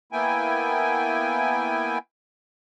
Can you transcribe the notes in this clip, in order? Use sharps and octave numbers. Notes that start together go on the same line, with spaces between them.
A#3 B3 E4 G5 G#5